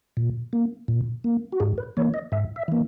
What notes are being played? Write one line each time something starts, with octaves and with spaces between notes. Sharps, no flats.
A#2
A#3
A#2
A#3
F#4
G#2 G#4
B4
E3 A#3 C#5
D#5
G#2 E5
E5
E3 A#3